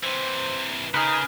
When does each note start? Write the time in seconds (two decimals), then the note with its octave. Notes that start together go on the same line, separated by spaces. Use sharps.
0.03 C3 E3 C5
0.94 C#3 D#4 G#4 A#4 B4